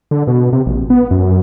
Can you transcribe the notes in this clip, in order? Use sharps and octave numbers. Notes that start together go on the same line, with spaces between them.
D3
B2
C3
A#1
B3
F#2